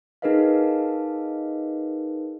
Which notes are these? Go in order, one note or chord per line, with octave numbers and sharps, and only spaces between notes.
D#4 G#4 A#4 B4 D#5 F5